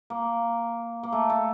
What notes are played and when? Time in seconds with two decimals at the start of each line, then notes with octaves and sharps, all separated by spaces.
0.10 A#3
1.03 A#3
1.12 A3
1.30 A3